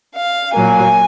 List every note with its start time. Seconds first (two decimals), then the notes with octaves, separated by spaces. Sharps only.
0.16 F5
0.54 A#2 F#3 A#3 G#5